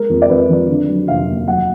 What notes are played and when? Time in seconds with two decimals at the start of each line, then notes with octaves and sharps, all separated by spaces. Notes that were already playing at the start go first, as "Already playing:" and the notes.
Already playing: G#3 A#4
0.09 F2
0.22 D5
0.30 F2 B4
0.49 F3
0.69 D3
0.88 F#3
1.08 F1 F5
1.28 D#2
1.48 F#3 F#5